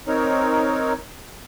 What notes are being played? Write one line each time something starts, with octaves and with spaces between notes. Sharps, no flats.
C4 D#4 A#4 C#5